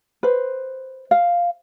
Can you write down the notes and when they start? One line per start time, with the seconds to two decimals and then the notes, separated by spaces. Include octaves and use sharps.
0.23 B4 C5
1.11 F5